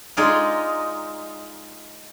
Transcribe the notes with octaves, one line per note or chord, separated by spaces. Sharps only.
G#3 D#4 F4 G#4 D5 F5